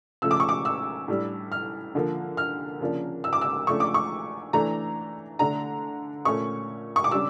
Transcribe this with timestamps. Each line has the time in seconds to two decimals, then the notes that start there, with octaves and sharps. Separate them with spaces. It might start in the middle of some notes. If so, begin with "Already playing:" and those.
0.22 C#3 F3 A3 E6
0.31 D6
0.40 C#6
0.49 D6
0.65 E6
1.08 A2 G3 D4
1.52 F6
1.95 D3 F3 A#3
2.37 F6
2.80 C#3 F3 A#3 D4
3.24 E6
3.33 D6
3.41 E6
3.67 C#3 F3 A3 D4 C#6
3.80 D6
3.94 C#6
4.53 E3 A3 D4 A#5
5.39 D3 A3 D4 A#5
6.25 A#2 A3 C#4 C#6
6.96 C#6
7.04 D6
7.11 C#3 G3 D4 E6